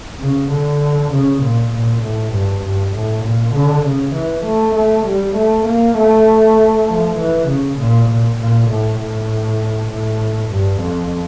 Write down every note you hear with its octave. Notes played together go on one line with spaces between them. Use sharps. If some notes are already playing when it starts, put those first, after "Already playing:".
C#3
D3
C#3
A#2
A#2
A2
G2
G2
A2
A#2
D3
C#3
E3
A3
A3
G3
A3
A#3
A3
F3
E3
C#3
A#2
A#2
A#2
A2
A2
A2
G2
F2